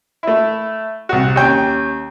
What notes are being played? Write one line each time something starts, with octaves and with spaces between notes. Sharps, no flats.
A3 E4
C2 F#4
D#2 C#4 G5